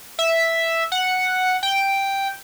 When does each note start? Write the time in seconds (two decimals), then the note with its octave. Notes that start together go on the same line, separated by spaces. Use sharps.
0.19 E5
0.92 F#5
1.63 G5